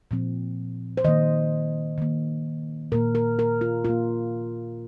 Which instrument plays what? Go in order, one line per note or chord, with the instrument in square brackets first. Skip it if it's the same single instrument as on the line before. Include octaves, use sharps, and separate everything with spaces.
[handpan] A#2 F3 C4
C5
D#3 A#3 D#5
D#3 A#3
A#2 A#3 A#4
A#4
A#4
F4
A#2 A#3 F4